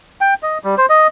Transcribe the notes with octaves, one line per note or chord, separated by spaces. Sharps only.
G5
D#5
G3
C5
D#5